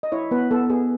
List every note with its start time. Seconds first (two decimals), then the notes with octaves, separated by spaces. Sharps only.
0.03 D#5
0.12 E4 C#5
0.31 B3 B4
0.51 B3 A4
0.70 B3 G#4